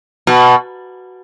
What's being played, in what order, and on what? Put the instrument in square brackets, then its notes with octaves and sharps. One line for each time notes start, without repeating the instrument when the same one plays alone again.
[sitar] B2